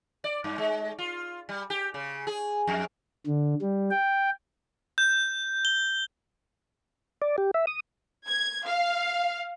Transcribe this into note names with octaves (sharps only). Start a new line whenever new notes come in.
D5
G2
G#3
F4
G3
G4
C#3
G#4
F2
D3
G3
G5
G6
G7
D5
G4
E5
D#6
G#6
F5